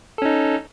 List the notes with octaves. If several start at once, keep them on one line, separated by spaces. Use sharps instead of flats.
C#4 D#4 A4